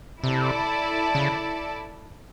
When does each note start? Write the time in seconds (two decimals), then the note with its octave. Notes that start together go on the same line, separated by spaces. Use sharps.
0.24 C3 E4 A4 D5
1.15 C#3